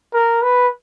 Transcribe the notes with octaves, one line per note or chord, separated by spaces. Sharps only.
A#4
B4